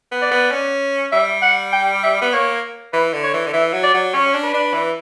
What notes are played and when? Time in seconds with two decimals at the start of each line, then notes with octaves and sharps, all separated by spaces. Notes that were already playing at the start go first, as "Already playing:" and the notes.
0.12 B3
0.22 D5
0.31 B3
0.51 C#4
1.12 G3 E5
1.42 F#5
1.73 G5
2.03 E5
2.22 B3
2.33 A#3 C#5
2.93 E3 B4
3.13 D3
3.23 C#5
3.34 E3
3.47 D3
3.53 E3 E5
3.73 F#3
3.83 D5
3.94 F#3
4.13 C#4 C#5
4.34 D4
4.43 B4
4.54 D4
4.73 E3